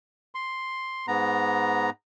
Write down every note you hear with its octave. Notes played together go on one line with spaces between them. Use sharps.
C6
G#2 B3 A#5